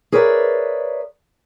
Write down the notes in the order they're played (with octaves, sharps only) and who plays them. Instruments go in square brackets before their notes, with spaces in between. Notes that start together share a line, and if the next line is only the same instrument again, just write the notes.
[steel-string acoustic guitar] G#4 A#4 B4 C#5 D5 E5